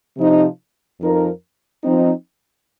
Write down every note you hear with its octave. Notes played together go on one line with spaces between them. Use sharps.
C3 F3 D#4
F2 F3 D#4 A#4
F3 C4 D#4